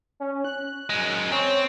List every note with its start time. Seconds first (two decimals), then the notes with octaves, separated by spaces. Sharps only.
0.20 C#4
0.45 F#6
0.90 F#2 G#3
1.31 C4 C#5